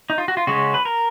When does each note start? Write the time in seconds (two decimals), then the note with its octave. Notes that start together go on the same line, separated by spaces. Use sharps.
0.10 D#4
0.18 F4
0.28 F#4
0.37 F4
0.47 C#3 G#3 C#4 F#4
0.74 B4
0.85 A#4